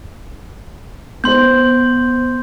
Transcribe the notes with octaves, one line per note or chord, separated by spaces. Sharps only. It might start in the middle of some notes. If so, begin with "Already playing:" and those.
B3 C5 C6 G6